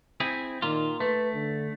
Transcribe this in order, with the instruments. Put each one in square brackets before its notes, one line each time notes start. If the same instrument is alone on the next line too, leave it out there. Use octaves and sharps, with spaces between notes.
[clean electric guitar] C4 E4 G#4
[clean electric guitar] A#2 F4 [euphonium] D#3
[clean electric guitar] A3 [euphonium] B4
[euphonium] D3